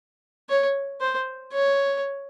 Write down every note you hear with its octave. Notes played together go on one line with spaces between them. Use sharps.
C#5
C5
C#5